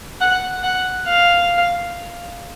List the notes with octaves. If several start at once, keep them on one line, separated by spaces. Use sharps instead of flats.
F#5
F#5
F5